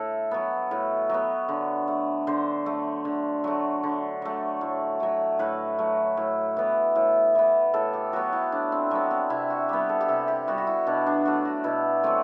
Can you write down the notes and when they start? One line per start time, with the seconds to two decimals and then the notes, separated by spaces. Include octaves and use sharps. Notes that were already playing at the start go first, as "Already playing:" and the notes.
Already playing: A2 A4
0.31 F#3 B3
0.71 A2 B4
1.09 F#3 B3
1.49 D3
1.88 A3
2.27 D3 C5
2.66 A3
3.05 D3
3.44 F#3 A3
3.84 D3
4.22 F#3 A3
4.61 A2
5.00 F#3 A3
5.39 A2 B4
5.79 F#3 A3
6.17 A2
6.57 E3 B3
6.96 A2
7.35 E3 B3
7.74 A2 A4
7.93 G4
8.13 F#3 B3 F#4
8.33 E4
8.52 A2 D4
8.72 C4
8.91 F#3 B3 D4
9.11 C4
9.30 C3 E4
9.50 F#4
9.69 G3 B3 G4
9.89 A4
10.01 G4
10.08 C3 A4
10.28 G4
10.47 G3 B3 F#4
10.58 F#4
10.67 E4
10.86 B2 D4
11.06 D4
11.25 F#3 A3 F#4
11.45 F#4
11.64 B2 E4
12.03 F#3 A3 C4